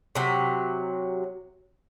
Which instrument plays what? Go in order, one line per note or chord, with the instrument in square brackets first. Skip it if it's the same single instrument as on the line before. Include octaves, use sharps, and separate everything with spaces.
[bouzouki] C3 F#3